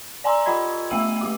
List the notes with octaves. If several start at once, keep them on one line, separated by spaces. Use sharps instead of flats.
D5 G#5 A#5 C6 E6
F4 G4 D#5 B5 G#6
A3 B3 E5 E6 D#7 F#7
A3 G4 D6